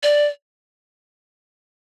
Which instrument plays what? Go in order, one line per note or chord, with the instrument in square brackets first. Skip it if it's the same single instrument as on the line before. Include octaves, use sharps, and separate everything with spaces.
[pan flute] D5